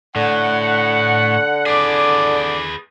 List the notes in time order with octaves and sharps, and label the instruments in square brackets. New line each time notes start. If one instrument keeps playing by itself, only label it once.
[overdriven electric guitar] A2 [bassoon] D3 [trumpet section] F#5
[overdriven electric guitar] G#4 B4 [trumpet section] D5 D6